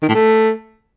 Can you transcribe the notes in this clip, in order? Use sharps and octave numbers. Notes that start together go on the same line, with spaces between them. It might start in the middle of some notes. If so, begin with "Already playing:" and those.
D#3
A2
A3